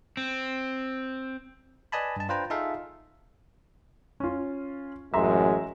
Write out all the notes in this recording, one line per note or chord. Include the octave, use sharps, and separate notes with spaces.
C4
B4 D5 D#5 G#5 A5 B5
G2 A5
D4 F4 B4 C5 G5 A#5
D#4 F4 G#4 A4 E5 F5
C#4 F4
A1 F#2 G#3 E5 A#5 C6